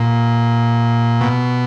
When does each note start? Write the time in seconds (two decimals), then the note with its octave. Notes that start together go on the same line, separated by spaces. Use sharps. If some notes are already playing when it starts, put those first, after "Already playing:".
Already playing: A#2
1.21 B2